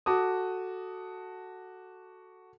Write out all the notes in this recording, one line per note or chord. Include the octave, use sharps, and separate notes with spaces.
F#4 A4 A5 D6 D#6